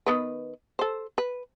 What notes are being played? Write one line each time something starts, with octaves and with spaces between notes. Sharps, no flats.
D#3 B3 B4
A4 C5
B4